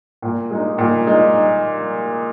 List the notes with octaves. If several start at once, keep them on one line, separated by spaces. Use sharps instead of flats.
A#2
G#3 D#4
A#2
G#3 D#4